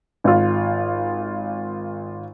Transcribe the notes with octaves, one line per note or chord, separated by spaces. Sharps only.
G#1 F4